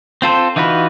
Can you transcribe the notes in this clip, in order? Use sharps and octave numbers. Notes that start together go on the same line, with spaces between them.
C4 F4 A4 C5
E3 D#4 F4 F#4 B4